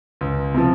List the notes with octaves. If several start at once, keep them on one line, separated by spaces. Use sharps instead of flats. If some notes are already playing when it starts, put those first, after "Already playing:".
C#2
C3 F3